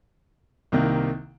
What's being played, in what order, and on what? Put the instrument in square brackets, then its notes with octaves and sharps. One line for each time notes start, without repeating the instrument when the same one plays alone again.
[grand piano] C2 C3 D#3 A#3